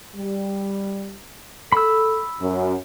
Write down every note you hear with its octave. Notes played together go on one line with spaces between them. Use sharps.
G3
A4 B5 E6
F#2